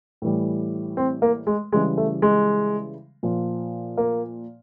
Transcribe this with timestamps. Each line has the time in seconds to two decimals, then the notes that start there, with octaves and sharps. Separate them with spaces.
0.22 A2 E3 G3
0.97 C4
1.22 A#3
1.47 G#3
1.72 C#3 E3 G3 G#3
1.97 A3
2.22 G#3
3.23 A#2 F3
3.97 A#3